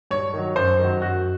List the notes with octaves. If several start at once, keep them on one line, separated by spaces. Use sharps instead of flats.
G2 C#5
D#3 F#3
F#2 C5
D#3 F#3
F#2 F#4